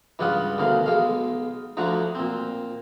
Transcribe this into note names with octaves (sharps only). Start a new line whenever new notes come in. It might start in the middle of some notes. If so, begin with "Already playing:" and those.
C#2 G2 G3 F4 F#5 D#6
D2 B2 D#3 F5
B1 G#3 F5
D2 D3 F3 F#4 A#5
A#2 C4